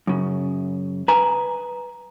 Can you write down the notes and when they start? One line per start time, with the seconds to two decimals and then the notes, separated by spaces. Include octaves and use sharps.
0.07 F#2 C#3
1.08 B4 G#5 A#5 D#6